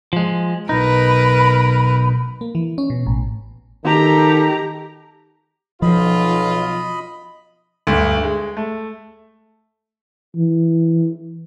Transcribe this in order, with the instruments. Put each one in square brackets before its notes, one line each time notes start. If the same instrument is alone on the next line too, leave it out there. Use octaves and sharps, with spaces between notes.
[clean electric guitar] F3 G#3
[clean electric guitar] B1 D#4 [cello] A#4 B4 [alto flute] B5
[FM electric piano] A#3
E3
C#4
B2
A1
[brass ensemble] D#3 A4 [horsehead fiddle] G4 A#5
[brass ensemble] B1 F4 [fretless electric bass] F3 [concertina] D#5 B5
[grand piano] D2 G2
G#3
A3
[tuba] E3